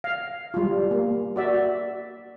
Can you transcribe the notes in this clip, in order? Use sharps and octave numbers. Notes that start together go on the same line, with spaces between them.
F5
G3 F4
A#3
F#4 D5 E5